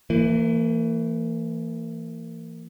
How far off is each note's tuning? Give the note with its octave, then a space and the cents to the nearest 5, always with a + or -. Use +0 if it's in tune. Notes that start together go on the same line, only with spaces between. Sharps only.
E3 +20 A#3 -35